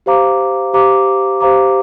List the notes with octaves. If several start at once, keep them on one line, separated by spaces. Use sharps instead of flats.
G4 C5 F5 A#5 D6
G4 C5 F5 A#5 D6
G4 C5 F5 A#5 D6